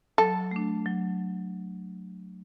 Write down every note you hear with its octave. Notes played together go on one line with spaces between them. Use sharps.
F#3 A4
A3 D4
F#3